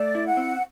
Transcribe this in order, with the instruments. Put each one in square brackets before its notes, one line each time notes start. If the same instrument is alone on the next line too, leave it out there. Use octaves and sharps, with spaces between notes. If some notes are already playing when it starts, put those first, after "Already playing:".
Already playing: [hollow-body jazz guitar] A3 [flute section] D5
[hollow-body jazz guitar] E4
[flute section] F#5
[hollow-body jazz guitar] C4